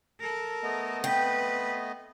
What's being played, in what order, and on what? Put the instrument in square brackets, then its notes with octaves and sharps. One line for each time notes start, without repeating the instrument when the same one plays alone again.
[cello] A4 A#4
[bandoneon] A3 B3 D#5
[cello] C4 B4 [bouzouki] G5